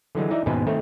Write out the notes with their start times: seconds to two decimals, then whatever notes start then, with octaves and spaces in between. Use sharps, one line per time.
0.15 D3 E3 F#3 G#3
0.30 E3 D#4 D5 E5
0.46 D#2 G#2 B2 C#4 B4 C5
0.67 D#3 A3 C4 C#5